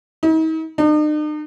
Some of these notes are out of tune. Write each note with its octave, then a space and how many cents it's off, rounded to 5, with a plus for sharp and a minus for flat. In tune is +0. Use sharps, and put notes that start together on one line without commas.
D#4 +45
D#4 -45